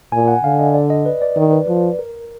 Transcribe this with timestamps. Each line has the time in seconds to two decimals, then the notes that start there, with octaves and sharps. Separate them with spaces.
0.12 A#2 G#5
0.28 F#5
0.44 D3 F5
0.59 D#5
0.74 D5
0.90 D#5
1.06 B4
1.22 D5
1.37 D#3 D5
1.52 B4
1.67 F3 B4
1.99 A#4